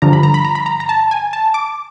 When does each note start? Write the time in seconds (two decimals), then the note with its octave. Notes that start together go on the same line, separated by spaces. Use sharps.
0.02 G2 D3 F3 A#5
0.13 B5
0.23 A#5
0.34 B5
0.45 A#5
0.55 B5
0.66 A#5
0.80 A#5
0.89 A5
1.11 G#5
1.33 A5
1.54 D6